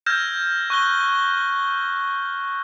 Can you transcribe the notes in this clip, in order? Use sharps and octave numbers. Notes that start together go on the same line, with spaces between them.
E6 F6 G6 G#6 A#6 E7
C#6 F#6 G7